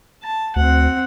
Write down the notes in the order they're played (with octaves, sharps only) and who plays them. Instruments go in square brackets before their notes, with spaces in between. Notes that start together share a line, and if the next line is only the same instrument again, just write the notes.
[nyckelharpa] A5
[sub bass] D2 [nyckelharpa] C4 F#5